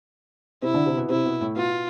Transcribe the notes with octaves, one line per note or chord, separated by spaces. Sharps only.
C3 C4 E4
D3 D4
C3 C4
B2 B3
C3 C4 E4
B2 B3
A2 A3
B2 B3 F4